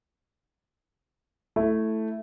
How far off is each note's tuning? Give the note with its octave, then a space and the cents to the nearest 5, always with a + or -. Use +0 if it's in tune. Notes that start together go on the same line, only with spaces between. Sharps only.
A3 +0 E4 +0